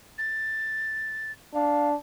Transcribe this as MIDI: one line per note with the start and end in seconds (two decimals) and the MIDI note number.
0.18 1.31 93
1.54 1.94 62
1.54 1.88 77